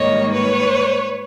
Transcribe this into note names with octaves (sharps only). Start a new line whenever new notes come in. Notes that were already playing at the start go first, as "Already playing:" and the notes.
Already playing: G#2 D#3 G3 A#3 C#5 D#5
B4 C#5